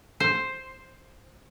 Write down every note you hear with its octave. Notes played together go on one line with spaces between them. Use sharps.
C5